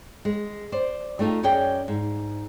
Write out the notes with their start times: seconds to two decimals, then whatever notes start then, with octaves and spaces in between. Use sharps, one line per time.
0.25 G#3
0.72 C5 D5
1.19 G3 A3 D#4 F4 G4
1.43 F#2 C#4 G#4 D5 D#5 G5
1.88 G#2